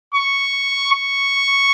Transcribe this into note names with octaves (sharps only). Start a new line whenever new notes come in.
C#6
C#6